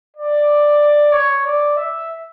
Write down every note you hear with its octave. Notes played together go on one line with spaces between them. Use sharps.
D5
C#5
D5
E5